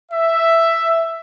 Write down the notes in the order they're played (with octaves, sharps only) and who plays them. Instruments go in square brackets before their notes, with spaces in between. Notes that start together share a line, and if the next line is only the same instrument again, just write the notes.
[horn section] E5